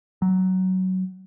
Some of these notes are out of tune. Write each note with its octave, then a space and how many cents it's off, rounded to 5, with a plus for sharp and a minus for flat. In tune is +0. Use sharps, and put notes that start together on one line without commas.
F#3 +15